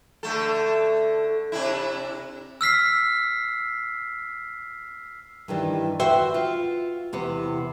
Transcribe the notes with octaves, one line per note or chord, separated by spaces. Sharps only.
D3 A3 A4
C3 D4 E4
E6 F6 B6 C7
G2 D#3 E3 G3
F#4 B4 C5 E5 F#5 G5
F4
E2 C3 B3